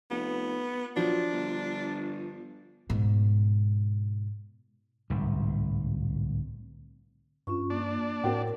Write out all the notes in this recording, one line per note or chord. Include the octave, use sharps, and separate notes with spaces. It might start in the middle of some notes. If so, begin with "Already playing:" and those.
F1 B3
F3 F#3 D4
G1
G#2 B2
D1 C2 G#2
G2 C#4 F4 C#6
A#3 D4
A2 C4 F#4 A#4 G5